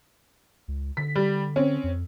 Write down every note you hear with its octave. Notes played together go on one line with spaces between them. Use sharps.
C#2
D3 B6
G3
C4 C#4
F2